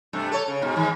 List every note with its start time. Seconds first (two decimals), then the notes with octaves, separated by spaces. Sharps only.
0.13 G2 C3 A3
0.31 A4 C#5
0.48 C#3
0.61 G#2 B2
0.76 G#2 D#3